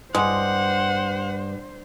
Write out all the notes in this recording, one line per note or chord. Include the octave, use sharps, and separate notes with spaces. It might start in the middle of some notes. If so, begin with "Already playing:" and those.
G2 G#3 C5 F#5